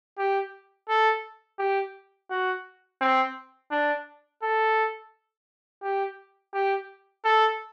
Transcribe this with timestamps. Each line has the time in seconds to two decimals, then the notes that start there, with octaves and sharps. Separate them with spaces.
0.19 G4
0.89 A4
1.59 G4
2.30 F#4
3.01 C4
3.71 D4
4.42 A4
5.83 G4
6.54 G4
7.25 A4